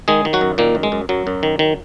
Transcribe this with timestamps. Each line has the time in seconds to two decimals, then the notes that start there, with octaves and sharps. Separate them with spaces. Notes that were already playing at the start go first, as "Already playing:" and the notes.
0.08 D#3 G#3 G#4
0.25 D#3
0.33 F#3 F#4
0.41 F#2
0.58 A#2 D#3 A#3
0.75 F#2
0.83 G#3
0.92 F#2
1.09 F#2 F#3
1.27 F#2
1.43 D#3
1.59 D#3